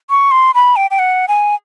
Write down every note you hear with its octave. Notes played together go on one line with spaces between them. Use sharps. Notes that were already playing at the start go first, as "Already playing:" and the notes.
C#6
C6
B5
G5
G5
F#5
G#5